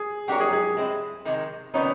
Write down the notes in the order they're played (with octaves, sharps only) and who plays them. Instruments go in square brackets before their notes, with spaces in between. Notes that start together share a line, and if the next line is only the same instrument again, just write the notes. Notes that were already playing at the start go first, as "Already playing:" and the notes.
Already playing: [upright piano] G#4
[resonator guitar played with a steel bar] A#3 D4 F#4 A#4 C#5 [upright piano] G4
[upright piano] G#4
G#4
[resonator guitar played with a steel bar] G#3 C4 E4
C3 D#3 G#3
[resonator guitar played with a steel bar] C3 D#3 G3 B3 D#4 [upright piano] C#4